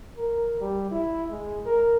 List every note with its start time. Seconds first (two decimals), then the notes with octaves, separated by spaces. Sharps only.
0.17 A#4
0.61 G3
0.91 E4
1.31 G#3
1.66 A#4